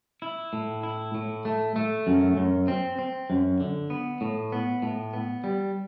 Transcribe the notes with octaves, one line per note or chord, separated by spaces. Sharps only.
E4
A2
E4
A2
A3
A3
F#2
F#2
C4
C4
F#2
D3
B3
A2
B3
A2
B3
G3